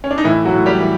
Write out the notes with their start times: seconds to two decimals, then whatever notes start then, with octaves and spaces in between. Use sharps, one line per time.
0.04 C#4
0.11 D4
0.18 D#4
0.24 A2 E3 E4
0.45 F#3 F#4
0.53 A2
0.66 G3 G4
0.80 E3